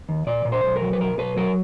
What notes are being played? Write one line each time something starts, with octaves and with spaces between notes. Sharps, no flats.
D#2
A#2 D5
A#2
C5
B1
A#4
F#3
B4
B1 A#4
B1 B4
F#3 A#4